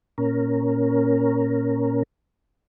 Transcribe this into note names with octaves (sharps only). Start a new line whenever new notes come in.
A#2 C#4 A#4